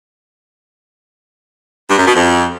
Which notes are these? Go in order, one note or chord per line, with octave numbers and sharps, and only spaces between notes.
G2
F#2
B2
F2